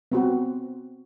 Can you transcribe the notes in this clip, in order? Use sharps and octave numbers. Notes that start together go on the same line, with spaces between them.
B3 C4 F#4